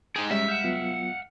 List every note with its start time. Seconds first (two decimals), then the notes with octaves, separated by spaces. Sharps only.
0.16 D#4 G4 G#4
0.31 F#2 G3 G#3 C#4 D#4 E5
0.48 F5 F#5 G6
0.64 F#3 B3 F4